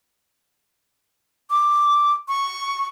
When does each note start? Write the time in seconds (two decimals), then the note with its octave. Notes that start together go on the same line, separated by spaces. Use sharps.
1.50 D6
2.28 C#6